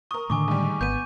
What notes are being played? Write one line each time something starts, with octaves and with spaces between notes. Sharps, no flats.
A#4 C#6 D#6
A2 D3 D#3 A3 G#5 C#6 D6
G#2 G3
G#1 B3 G6 D#7